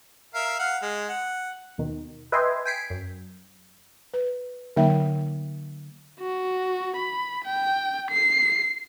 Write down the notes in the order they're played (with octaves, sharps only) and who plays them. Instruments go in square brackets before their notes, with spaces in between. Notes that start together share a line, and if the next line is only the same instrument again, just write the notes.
[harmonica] A#4 E5 F5
F5 F#5
G#3
F#5
[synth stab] D#2 B2 D#3
B4 D#5 E5 G5 G#5 C6
G5 G#5 B6 C7 D7
F#2
[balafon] B4
D3 F#3 A#3 D#4 E5 G5
[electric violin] F#4
B5
G5
C7